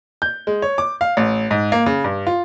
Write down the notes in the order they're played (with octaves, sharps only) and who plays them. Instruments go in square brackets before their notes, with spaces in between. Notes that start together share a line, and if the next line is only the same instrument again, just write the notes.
[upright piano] G6
G#3
C#5
D6
F5
A1
G#2
A#3
C#3
G2
F4